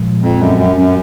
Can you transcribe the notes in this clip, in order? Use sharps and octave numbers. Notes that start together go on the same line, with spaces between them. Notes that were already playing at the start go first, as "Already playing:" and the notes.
Already playing: A#2 F3 G#3
F2
F#2
F#2
F#2